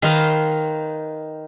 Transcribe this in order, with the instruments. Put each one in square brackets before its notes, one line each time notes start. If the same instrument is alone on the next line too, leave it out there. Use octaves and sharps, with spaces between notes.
[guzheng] D#3 D#4 B4 C5 F5 A#5